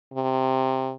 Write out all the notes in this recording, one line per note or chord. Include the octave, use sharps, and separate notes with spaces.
C3